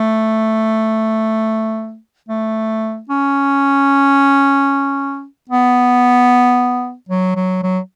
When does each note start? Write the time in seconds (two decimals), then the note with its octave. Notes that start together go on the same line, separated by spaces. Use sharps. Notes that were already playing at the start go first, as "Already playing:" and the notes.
Already playing: A3
2.29 A3
3.09 C#4
5.49 B3
7.09 F#3
7.36 F#3
7.63 F#3